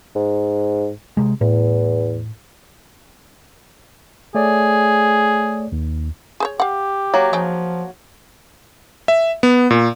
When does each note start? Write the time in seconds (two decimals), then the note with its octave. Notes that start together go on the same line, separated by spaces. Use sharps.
0.16 G#2
1.17 C3 G#3
1.41 E2 A2
4.35 A3 G#4 C#5 D5
5.72 D#2
6.40 G#4 C5 C#5
6.60 G4 F5 F#5
7.14 F#3 A#3
7.33 C#3 F3 D#4 G5
9.08 E5
9.43 B3
9.71 A#2